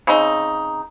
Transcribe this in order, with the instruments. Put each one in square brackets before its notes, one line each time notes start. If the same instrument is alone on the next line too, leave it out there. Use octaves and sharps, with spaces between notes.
[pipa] C#3 C4 D#4